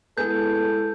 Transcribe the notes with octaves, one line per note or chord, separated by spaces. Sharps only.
G#3 B3 E4 G#4 A4 G6